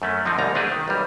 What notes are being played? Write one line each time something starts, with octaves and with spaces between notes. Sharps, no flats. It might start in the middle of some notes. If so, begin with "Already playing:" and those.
F#2 A3 C#4
D3 F3 C4 D4 D#4
C2 G#2 G3 D#4 A#5
A3 D4 F#4 G#4 B4
D#3
B1 G3